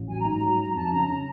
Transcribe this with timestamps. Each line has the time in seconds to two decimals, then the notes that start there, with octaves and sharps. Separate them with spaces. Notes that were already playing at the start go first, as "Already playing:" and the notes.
Already playing: A1
0.08 F#3 G#5
0.19 A#5
0.25 G#2
0.31 A#5
0.42 F#3
0.59 F#3
0.75 F2 A5
0.92 C#3 A#5
1.09 C#3 A#5